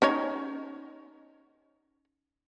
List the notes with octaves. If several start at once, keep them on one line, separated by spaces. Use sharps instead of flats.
C#4 D#4 C#5